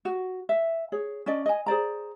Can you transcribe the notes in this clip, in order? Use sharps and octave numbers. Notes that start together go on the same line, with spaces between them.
F#4
E5
G#4 C#5
C#4 D4 D5 D#5
D#5 G#5
G#4 C5 D5 A#5